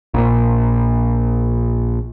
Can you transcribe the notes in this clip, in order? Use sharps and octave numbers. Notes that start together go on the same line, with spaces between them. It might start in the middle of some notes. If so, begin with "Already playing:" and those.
A#1 A#2